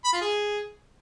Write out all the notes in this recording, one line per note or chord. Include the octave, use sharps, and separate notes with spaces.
B5
F4
G#4